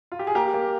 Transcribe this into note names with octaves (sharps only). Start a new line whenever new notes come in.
F4
G4
G#4
A#3 G4 A#4
A#3